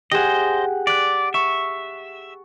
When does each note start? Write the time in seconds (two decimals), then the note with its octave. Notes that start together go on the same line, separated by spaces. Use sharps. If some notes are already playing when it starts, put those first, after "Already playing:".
0.12 G4 G#4 C5 D#5 F#5
0.87 D5 F#6 A6 B6
1.34 E5 C#6